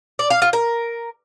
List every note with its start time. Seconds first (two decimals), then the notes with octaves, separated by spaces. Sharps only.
0.19 D5
0.30 F5
0.42 F4
0.53 A#4